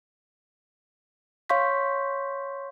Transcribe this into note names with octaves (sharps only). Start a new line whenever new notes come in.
C#5 F5 C6 C#6 G6 B6